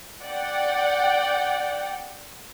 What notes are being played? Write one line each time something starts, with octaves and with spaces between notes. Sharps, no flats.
D5 F#5 G5